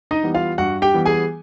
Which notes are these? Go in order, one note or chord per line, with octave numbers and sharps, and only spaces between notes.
D#4 D#5
E3 G3 B3
F4 F5
G2 F#4 F#5
G4 G5
E3 G3 B3
G#4 G#5